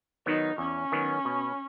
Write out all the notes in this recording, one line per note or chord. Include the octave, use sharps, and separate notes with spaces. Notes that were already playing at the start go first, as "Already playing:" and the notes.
D#3 F#3 B3 D#4
E2 C#4
D#3 F#3 B3
B2